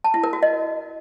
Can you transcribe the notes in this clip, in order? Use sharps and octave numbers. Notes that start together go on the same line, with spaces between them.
A5
E4
A#4
F#4
D#5